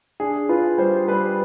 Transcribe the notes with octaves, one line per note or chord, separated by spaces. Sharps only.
D4 G#4
F4 B4
G3 C5
G3 B4